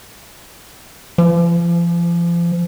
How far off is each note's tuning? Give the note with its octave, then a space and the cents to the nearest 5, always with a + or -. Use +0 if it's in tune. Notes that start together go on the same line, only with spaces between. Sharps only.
F3 -35